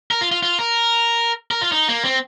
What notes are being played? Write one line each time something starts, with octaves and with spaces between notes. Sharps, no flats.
A#4
F4
F4
F4
A#4
A#4
F4
D#4
A#3
C4